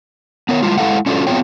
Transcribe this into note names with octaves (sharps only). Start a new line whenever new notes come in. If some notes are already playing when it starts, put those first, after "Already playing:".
B3 A#4 C#5
G3 G#3 E4 F4
G#3 E4 A4 F5 F#5
C#4 D4 F4 F#4 A4
B3 C4 F4 G#4 C#5 G5